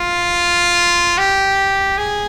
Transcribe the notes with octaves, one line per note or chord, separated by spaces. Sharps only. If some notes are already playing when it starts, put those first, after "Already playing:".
Already playing: F4
G4
G#4